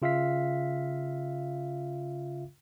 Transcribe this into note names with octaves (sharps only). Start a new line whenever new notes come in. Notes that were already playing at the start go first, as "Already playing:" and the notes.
C#3 F4 E5 F5 B6